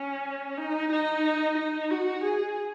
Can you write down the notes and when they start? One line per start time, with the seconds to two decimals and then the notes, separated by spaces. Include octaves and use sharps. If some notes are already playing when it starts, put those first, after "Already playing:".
Already playing: C#4
0.58 D#4
0.92 D#4
1.57 D#4
1.91 F#4
2.24 G#4